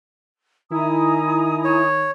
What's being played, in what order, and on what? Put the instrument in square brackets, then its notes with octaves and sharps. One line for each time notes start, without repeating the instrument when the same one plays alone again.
[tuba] D#3 [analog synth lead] E4 [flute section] G#5 A#5 D#6
[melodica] C#5